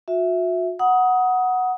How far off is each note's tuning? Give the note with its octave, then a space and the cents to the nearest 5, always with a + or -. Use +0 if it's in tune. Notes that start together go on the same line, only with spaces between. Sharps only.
F#4 -40 E5 +0
F#5 +0 A#5 +45 D#6 +20